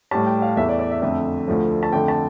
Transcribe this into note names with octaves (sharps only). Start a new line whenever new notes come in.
A2 G3 A5
G5
F5
E2 E3 A3 E5
D5
D5
E5
F2 D3 A3 E5
D2 D3 F3 A3
A5
F2 D3 A3 G5
A5